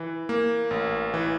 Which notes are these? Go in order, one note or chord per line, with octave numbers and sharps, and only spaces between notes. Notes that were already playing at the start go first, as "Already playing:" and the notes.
Already playing: E3
A#3
A1
E3